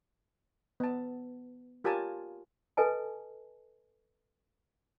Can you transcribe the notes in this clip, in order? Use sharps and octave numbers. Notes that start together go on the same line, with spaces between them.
B3 A5
F4 G4 A#4 C#5 G#5 A5
A4 B4 D#5 G#5 A5